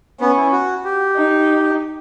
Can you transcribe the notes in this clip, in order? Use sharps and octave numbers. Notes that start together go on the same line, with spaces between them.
B3 C#4
E4
F#4
G4
D#4